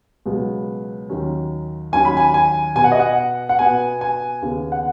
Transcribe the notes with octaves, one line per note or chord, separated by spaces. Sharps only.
C#2 B2 F#3 B3
D#2 D#3 F#3 C#4
D#2 D#3 F#3 C#4 G#5
B5
G#5
G#5
B2 B3 G#5
F#5
D#5
F#5
F#5
B2 B3 G#5
G#5
D#2 C#3 B3
F#5